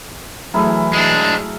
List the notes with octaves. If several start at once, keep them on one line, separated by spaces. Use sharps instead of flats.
E3 F#3 A3 E4 G#4 A#4
G#3 D4